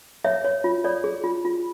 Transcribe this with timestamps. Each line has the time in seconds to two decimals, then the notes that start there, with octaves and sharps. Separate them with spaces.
0.24 C#5 E5
0.45 C#5
0.64 F4
0.84 C#5 D5
1.04 G#4
1.24 F4
1.45 F4